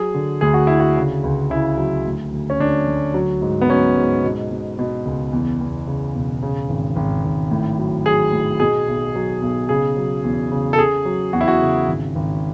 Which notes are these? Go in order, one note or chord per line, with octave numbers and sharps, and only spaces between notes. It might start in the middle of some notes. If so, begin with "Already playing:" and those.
Already playing: F#3 G#4
D3
D2 G#4
F#4
D3 E4
F#4
C#3
C#2
C#3 E4
F#3
D2
D2
C#4
D2 D4
D2
F#3
G#2
B3
F#3 C#4
G#2
B2
B2
B2
C#2
E2
E2
C#3
E1
C#3
G#1
G#1
G#1
A2
F#3
F#3 G#4
A2
B2 G#4
B1
F#3
B1
C#3 G#4
F#3
E2
C#3
A4
C#3 G#4
F#3
E2 F#4
E4
F#4
C#3
G#1
G#1